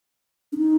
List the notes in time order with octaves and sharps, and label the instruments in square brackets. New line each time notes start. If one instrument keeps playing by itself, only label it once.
[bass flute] D4
D#4